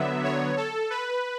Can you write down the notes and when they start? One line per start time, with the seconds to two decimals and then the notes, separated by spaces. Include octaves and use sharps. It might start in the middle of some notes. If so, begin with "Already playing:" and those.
Already playing: D3 F#3 B3 E5
0.24 C#5
0.57 A4
0.90 B4